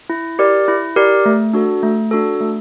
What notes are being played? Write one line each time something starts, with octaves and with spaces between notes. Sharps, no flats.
E4
G4 A#4 D5
E4
G4 A#4 D5
A3
D4 F#4 A4
A3
D4 F#4 A4
A3